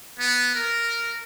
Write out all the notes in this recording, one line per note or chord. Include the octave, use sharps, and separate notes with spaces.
B3
A#4